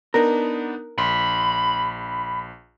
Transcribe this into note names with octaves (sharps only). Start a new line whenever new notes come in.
B3 D4 D#4 A#4
A#1 B5 C6